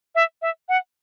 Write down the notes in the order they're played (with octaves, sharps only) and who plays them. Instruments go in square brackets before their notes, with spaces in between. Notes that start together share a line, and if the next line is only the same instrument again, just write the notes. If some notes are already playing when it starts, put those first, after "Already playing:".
[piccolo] E5
E5
F#5